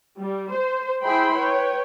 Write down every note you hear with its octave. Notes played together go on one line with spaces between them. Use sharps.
G3
C5
E4 G#4 C5 G5 B5 C6
B4 C#5 G5